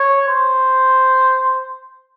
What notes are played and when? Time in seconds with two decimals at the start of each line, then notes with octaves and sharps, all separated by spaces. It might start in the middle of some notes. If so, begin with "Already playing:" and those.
Already playing: C#5
0.28 C5